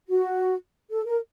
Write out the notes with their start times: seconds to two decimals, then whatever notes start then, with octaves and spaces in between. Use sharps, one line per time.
0.09 F#4
0.90 A4
1.06 A#4